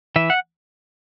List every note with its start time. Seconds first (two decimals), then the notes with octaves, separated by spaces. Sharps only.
0.16 E3 E5
0.30 F#5